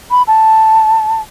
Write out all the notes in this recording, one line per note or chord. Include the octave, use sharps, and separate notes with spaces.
B5
A5